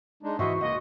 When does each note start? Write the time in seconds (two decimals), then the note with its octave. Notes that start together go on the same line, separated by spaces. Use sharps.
0.23 G#3 D4 D#4
0.39 G#2 E3 F#4 C5 D#5 E5 C#6
0.61 C#2 A#3 D#5 F#5